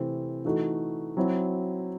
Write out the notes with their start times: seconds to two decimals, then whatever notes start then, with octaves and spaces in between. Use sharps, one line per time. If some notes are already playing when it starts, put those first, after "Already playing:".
Already playing: C3 E3 A3 C4
0.45 E3 A3 D#4 F#4
1.17 F#3 C4 E4